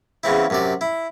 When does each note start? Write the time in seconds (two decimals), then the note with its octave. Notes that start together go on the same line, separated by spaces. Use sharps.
0.23 E2 C#3 C4 E4
0.50 F#2 C3 D5
0.81 E4